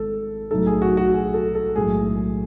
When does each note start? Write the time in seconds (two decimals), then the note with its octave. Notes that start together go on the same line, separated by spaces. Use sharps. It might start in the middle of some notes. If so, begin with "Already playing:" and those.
Already playing: G#1 G#2 A4
0.51 B1 A2 F#3 A3 D#4 A4
0.67 G#4
0.82 F#4
0.97 F#4
1.13 G#4
1.34 A4
1.55 A4
1.75 B1 A2 G#3 G#4